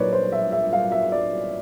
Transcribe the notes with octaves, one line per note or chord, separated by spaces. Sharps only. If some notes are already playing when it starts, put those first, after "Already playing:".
Already playing: A#2 F#3 A#3 D#4 B4 C#5 D5
C5
E5
E5
F5
E5
D5